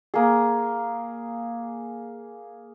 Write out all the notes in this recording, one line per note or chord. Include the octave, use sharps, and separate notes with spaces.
A#3 G#4